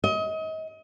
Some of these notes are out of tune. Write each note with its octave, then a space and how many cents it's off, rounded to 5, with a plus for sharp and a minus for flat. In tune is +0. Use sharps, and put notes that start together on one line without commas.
D#5 +35